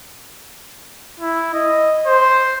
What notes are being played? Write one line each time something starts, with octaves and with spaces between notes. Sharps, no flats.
E4
D#5
C5